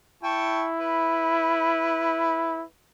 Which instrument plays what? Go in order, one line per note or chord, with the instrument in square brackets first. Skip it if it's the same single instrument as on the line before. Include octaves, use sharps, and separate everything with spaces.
[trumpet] E4 [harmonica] G5 A5 C#6
[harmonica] B4